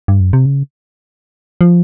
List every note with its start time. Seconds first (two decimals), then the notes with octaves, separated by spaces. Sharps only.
0.08 G2
0.20 F#2
0.33 C3
0.46 C#3
1.61 F3